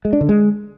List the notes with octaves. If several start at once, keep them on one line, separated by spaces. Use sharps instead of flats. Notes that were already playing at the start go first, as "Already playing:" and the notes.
G#3
D4
D3
G#3